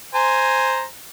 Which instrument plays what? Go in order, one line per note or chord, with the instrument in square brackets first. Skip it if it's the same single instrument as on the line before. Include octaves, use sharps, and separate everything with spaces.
[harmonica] C5 G#5 A#5